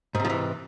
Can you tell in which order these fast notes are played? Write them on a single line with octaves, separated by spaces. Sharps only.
G#2 C3 F3 E3